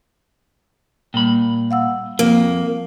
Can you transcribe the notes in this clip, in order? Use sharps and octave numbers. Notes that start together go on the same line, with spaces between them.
A#2 G3 B5
F5 F#5 E6
F2 A#3